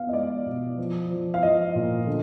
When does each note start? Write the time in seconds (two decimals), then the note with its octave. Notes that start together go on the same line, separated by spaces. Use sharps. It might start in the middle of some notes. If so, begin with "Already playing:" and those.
Already playing: B3 F5
0.09 D#5
0.13 G#3 D5
0.46 B2
0.78 F3
1.10 F3
1.34 F5
1.43 F3 D#5
1.75 A#2
2.07 D3